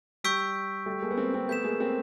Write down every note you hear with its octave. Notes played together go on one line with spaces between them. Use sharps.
G3 C#6 E6 G6 B6 D7
G3 A3
G#3 A#3
B3
A#3 C4
A#3 C4
A3 B3 G6 B6 E7
G#3 A#3
A#3 C4